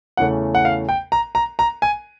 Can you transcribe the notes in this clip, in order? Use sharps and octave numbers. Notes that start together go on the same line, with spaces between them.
E2 C#3 E3 A3 C#4 F#5
F#5
F5
G5
A#5
A#5
A#5
G#5